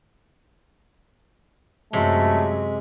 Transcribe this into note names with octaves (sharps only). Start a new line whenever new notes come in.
F#2 C3 F#3 G#3 A3